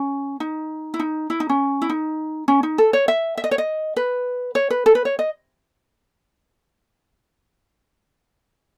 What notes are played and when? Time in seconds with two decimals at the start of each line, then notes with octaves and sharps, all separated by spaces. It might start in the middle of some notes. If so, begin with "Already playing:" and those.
Already playing: C#4
0.40 D#4
0.94 E4
0.99 D#4
1.30 E4
1.40 D#4
1.49 C#4
1.82 E4
1.90 D#4
2.48 C#4
2.63 D#4
2.78 A4
2.93 C#5
3.08 E5
3.38 E5
3.44 D#5
3.51 C#5
3.58 D#5
3.96 B4
4.55 C#5
4.70 B4
4.86 A4
4.95 B4
5.05 C#5
5.19 D#5